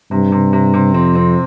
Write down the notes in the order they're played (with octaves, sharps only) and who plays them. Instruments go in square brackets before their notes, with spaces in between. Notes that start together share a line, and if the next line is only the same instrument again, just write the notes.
[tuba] G2 [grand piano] C3
[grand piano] C3
C3
C3
[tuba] F2 [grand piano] C4
[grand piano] C4